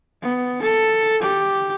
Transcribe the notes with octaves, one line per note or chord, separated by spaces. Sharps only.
B3
A4
G4